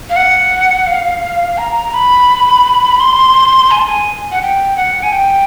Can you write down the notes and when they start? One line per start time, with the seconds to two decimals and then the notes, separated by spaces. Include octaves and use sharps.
0.10 F5
0.16 F#5
0.87 F5
1.58 A#5
1.94 B5
3.00 C6
3.71 G#5
3.78 A5
3.86 G#5
4.32 F#5
4.42 G5
4.77 F#5
5.03 G#5
5.12 G5